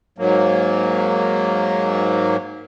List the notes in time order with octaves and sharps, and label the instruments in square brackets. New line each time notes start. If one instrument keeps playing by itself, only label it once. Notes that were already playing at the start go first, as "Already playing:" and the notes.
[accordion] G#2 F#3 A#3